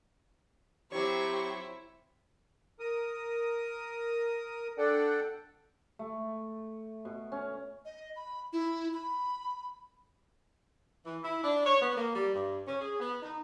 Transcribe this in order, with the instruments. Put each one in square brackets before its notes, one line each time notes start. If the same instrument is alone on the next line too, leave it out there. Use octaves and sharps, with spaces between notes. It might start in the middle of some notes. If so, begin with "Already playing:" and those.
[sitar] F#3 C#5 [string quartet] C4 C#6 [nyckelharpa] E4 C5 [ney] G4
[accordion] A#4 D#6
D4 A4 D5 F#5 G5
[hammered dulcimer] A3
B2
C#4
[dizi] D#5
B5
E4
B5
[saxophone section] E3
E4
D4
C#5
B3
A#3
G3
G2
C#4
G#4
B3
D#4